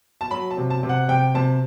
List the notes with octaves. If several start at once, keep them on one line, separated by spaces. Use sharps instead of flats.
A5
F#3 B5
A5
C3
A5
C3
F#5
C3 G5
C3 A5